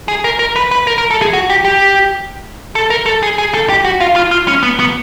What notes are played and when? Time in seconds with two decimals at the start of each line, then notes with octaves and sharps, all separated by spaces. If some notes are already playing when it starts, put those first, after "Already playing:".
0.08 G#4
0.24 A#4
0.39 A#4
0.56 B4
0.71 B4
0.87 A#4
0.98 A#4
1.11 A4
1.22 G#4
1.33 F#4
1.50 G4
1.65 G4
2.75 A4
2.90 A#4
3.06 A4
3.23 G#4
3.38 G#4
3.54 A4
3.69 G4
3.85 F#4
4.00 F4
4.16 F4
4.31 F4
4.48 C#4
4.63 B3
4.79 B3